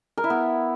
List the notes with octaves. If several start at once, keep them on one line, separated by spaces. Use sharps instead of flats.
A#4
E4
B3